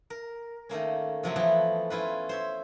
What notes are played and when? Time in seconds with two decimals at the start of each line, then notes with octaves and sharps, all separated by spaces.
0.10 A#4
0.69 D#3 A3 A#3 C#4
1.23 C3 F3 F#3 A3
1.36 E3 F3 B3 E4
1.90 C#4 E4 F4 B4
2.29 C5 C#5 E5